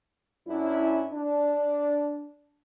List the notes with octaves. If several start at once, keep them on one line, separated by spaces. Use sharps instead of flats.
F#2 C#4 D4 E4
D4